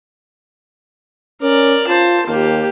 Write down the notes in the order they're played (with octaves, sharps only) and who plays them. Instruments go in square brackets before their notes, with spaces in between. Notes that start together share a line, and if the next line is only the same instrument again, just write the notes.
[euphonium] C#4 [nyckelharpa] A#4 D5
[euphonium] F4 [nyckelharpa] C5 A5
[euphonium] D#2 [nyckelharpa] A#3 G4